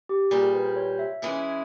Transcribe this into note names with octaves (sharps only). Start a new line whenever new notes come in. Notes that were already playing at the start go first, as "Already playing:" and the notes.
G4
A#2 G3 C4 G#4
A#4
B4
C5
C#5
E5
E3 G#3 C#4 E4 G#4